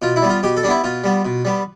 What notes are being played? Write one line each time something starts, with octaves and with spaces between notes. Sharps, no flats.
B2 F4
E4
G3 B3
F4
B2 G4
A4
G3 B3 D4 E4
B2 F4
G3 B3
B2
G3 B3